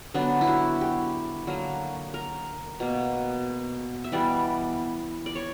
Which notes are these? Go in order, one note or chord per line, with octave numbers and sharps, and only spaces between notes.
D3 F#3 B3 D4
E4
F#4
G4
D3 F#3 A#3
A#4
B2 A#3
E5
E3 G3 B3 D5
D5
C#5